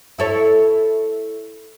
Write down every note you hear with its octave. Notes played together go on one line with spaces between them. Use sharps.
E4 A4 C#5